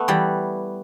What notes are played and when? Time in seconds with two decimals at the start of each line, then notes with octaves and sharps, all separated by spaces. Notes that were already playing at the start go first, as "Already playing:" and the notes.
Already playing: A3 B3
0.08 E3 G3